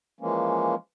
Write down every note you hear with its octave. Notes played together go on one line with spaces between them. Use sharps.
E3 F3 G#3 A#3 C#4